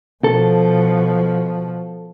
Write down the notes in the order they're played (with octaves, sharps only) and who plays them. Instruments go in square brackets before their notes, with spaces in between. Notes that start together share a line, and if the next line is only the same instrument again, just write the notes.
[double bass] B2 F3 [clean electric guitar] A4